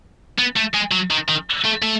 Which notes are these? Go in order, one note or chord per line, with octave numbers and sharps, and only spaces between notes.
B3
A3
G#3
F#3
D#3
D#3
A3
A3